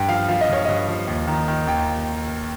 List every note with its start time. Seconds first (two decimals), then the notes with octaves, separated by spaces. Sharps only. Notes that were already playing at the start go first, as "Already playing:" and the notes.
Already playing: G2 G5
0.09 F3 F5
0.28 F3 F5
0.41 D#5
0.49 G2 C#5
0.65 G2 D#5
0.88 F3
1.07 D#2
1.27 D#3
1.48 D#3
1.67 D#2 G5